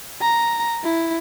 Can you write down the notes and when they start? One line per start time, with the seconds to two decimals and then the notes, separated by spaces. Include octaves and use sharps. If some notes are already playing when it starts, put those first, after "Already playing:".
0.21 A#5
0.84 E4